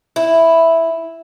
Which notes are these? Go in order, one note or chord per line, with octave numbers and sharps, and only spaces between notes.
E4